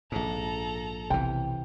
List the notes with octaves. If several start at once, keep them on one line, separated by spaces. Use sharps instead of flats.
A#1 G#2 A4 A#5
B1 C3 E3 B3 G5